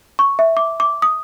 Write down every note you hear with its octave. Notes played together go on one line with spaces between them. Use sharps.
C#6
E5
D6
D6
D#6